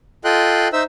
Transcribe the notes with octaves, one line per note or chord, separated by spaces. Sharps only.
F4 A4 D#5 G5 C6 F#6
D#4 C5 E5 E6